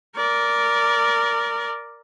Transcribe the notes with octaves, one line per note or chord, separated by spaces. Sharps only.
A#4 D5